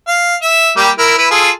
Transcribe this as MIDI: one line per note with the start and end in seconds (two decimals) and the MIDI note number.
0.07 0.35 77
0.42 0.71 76
0.77 0.90 55
0.77 0.90 58
0.77 0.90 67
0.98 1.16 64
0.98 1.16 70
1.18 1.27 64
1.18 1.27 71
1.31 1.50 65
1.31 1.50 68
1.31 1.50 69